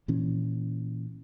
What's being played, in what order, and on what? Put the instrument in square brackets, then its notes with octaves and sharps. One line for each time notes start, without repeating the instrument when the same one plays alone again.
[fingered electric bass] A#2 E3 C#4